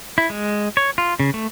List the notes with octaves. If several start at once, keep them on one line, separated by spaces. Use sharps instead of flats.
E4
G#3
C#5
F4
C#3
A3